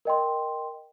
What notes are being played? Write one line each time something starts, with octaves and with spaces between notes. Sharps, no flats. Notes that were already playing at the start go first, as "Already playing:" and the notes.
A#4 D#5 G5 C6